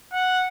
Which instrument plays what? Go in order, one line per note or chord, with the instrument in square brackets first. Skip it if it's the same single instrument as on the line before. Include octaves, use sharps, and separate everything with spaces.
[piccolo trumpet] F#5